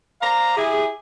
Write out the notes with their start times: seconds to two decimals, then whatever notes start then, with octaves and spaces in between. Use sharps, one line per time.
0.21 C5 D5 F5 A#5
0.57 E4 G4 G#4